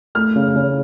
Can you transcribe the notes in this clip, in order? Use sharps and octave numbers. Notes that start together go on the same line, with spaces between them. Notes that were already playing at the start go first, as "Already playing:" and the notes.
A3 F6
C#3
C#3